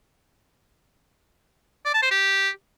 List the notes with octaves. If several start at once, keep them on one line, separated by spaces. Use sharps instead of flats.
D5
A5
C5
G4